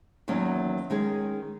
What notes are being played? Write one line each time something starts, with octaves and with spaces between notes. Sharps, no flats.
E2 D#3 F#3 A#3 C#4
D#3 G#3 C#4 G#4